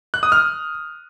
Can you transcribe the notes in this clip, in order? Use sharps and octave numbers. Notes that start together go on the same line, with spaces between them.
F#6
D#6
F6